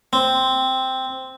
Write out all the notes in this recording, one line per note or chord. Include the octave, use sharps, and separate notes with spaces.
C4